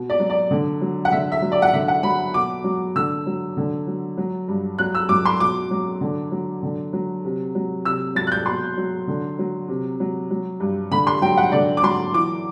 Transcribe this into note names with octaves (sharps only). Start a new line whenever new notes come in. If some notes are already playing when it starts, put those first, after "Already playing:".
Already playing: B2
D5
F#3
D5
D3
F#3
F#5
D3 E5
E5
F#3
D5
F#5
D3 E5
F#5
F#3 B5
B2 D6
F#3
D3 E6
F#3
D3
F#3
F#3
G2
F#3 F#6
E6
F#2 D6
C6
B2 D6
F#3
D3
F#3
D3
F#3
C3
F#3
C3 E6
F#3 A6
F#6
G6
B2 C6
F#3
D3
F#3
C3
F#3
F#3
G2
D3 B5
C6
F#3 G5
F#5
D3 D5
D6
F#3 C6
E3 D6